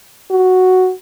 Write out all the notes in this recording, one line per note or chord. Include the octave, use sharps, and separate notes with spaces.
F#4